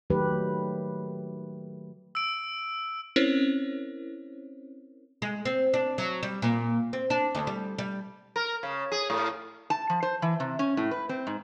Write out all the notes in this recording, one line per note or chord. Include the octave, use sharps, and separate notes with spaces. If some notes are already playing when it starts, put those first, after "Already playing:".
D#3 F#3 A3 G4 B4
E6 D7
C4 C#4 E4 A#4 C5 C#5
G#3
C4
D4
F#3
G3
A#2
C4
D4
D2
G3
G3
A#4
C#3
G#4
A2
A5
F3
C5
E3
C3
C#4
A2
B4
C4
G#2